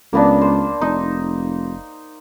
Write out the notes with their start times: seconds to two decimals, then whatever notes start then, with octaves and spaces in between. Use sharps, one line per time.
0.13 C#2 A#3 B3 D4
0.41 C5
0.81 F1 D#4